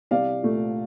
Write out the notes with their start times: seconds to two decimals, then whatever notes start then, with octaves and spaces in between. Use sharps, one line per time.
0.11 C2 D5 F5
0.43 A#2 A3